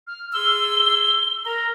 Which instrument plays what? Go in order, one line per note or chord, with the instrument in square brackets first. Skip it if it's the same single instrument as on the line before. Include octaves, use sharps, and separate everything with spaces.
[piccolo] F6
[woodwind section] G#4 C6 E6 [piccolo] G7
[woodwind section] A#4 A#5